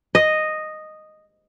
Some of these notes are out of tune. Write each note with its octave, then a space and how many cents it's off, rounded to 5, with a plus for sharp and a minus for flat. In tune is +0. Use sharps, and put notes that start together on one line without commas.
D#5 -5